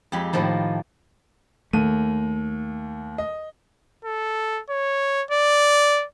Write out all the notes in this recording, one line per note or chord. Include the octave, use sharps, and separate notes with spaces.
F2 G#3 G4 B5
A2 D#3 F3 A#3
D#2 A3 D#7
D#5
A4
C#5
D5